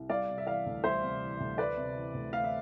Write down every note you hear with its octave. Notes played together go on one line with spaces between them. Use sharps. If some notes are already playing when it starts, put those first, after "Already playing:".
Already playing: C2
G3 D5 F5
C3
E5
E3 D5 F5
D2
G3 C5 E5
C3
E3
D2
A3 B4 D5
C3
E3
D2
A3 F5
E5